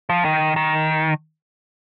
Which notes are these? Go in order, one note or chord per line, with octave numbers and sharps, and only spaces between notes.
F3
D#3
D#3